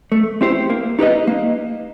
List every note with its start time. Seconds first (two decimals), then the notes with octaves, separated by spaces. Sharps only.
0.12 A3
0.41 C4 E4 G4 C5
0.70 A#3
0.99 D#4 G4 B4 D#5
1.27 A#3